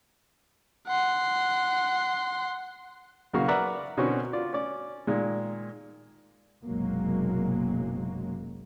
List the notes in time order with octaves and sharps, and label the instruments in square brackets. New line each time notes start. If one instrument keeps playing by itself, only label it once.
[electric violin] F#5 C6
[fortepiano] B1 C#3 A#3 F#4 F5
A#4 B4 D5 E5 F#5 A#5
B2 D3 C4 C#4 F#4 A#4
F4 D5
C#4 D5
A#2 D#3 G#3
[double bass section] F#1 B1 C3 F#3 G#3 A#3